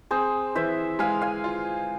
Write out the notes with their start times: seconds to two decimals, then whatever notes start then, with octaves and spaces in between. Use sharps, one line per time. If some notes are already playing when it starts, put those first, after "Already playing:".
0.11 C4 G#4 C5
0.55 E3 C5 E5
0.99 G#3 F5 G#5
1.22 F5 G#5
1.44 F4